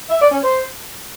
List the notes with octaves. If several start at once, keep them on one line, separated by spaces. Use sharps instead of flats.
E5
D5
C#4
C5